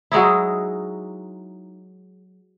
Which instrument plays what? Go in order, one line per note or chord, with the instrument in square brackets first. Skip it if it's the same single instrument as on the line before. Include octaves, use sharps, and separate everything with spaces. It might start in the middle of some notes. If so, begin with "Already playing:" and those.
[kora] F#3 G#3 D#4 E4